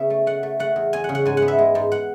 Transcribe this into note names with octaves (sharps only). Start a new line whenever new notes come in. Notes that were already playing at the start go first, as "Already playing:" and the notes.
Already playing: C#3 B3 E5
A3
A3 F#5
A3
A3 F#5
E2
E2 G#5
C#3 F#5
F#5
G#2 G#5
F#5
B3
E5
G#3
G#2
F#5